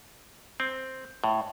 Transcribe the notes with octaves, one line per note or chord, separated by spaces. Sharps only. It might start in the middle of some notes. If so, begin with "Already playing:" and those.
C4
A2